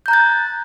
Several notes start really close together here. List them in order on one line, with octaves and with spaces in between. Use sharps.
G6 A#5 F#6 A6